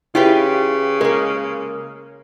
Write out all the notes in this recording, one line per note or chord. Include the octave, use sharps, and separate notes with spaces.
C#3 E4 F4 G4 B4
G#3 A#3 A#4